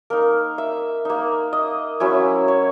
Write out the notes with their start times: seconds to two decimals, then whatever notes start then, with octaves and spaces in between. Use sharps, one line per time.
0.10 A#3 D#4 A#4
0.58 E5
1.05 A#3 D#4
1.53 D#5
2.00 F#3 C#4 E4
2.48 C#5